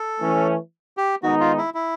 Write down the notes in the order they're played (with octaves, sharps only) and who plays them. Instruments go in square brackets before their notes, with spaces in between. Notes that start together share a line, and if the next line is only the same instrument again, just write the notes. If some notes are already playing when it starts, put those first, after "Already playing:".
Already playing: [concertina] A4
[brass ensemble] E3 A3 C#4
[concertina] G4
[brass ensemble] D#3 G#3 B3 D#4 [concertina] F#4
[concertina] F4
E4
E4